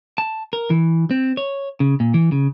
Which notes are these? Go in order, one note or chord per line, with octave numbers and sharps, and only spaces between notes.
A5
A#4
E3
C4
C#5
C#3
A#2
E3
C#3